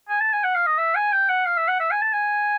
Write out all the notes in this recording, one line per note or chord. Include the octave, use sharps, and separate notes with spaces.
G#5
A5
G#5
F#5
F5
D#5
E5
G#5
G5
F#5
F5
E5
F#5
E5
G#5
A5
G#5